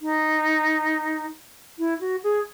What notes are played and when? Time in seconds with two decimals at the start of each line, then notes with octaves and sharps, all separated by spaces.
0.01 D#4
1.79 E4
2.01 F#4
2.24 G#4